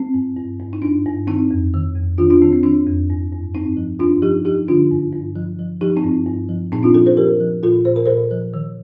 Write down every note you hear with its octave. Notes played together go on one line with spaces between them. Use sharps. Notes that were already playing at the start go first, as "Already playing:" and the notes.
Already playing: C4
G2
G2
G2
D#4
G2 D4
G2
D#3 C4 D#4
F2
D#3
F2
D#3 D4 F4
D4 F4
D#3 C4
C4
D#3 D4
F2
G2
G2
G2 C4 D#4
F3
G2 D4 F4
F3 D#4 G4
F3 D#4 G4
D3 D4 F4
G2
G2
F3
F3
F3 D#4 G4
C4 D#4
G2
G2
F3
A#2 C4 D#4
D4 F4
F3 F4 A4
A4 C5
F3 G4 A#4
F3
A#2 F4 A4
A#2 C5
A#4
A#2 A4 C5
F3
D#3